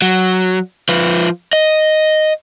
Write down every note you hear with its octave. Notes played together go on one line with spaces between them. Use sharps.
F#3
F3 B4
D#5